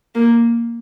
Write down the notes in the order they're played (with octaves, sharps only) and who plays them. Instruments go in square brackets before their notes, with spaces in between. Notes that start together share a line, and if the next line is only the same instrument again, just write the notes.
[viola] A#3